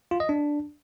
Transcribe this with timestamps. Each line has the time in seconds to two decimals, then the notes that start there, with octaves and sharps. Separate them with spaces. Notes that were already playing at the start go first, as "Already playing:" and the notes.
0.11 F4
0.20 D#5
0.29 D4